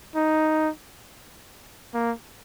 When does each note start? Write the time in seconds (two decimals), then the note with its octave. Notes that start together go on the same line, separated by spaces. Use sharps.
0.15 D#4
1.94 A#3